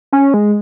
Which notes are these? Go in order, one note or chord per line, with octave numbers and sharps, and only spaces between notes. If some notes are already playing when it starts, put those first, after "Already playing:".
C#4
G#3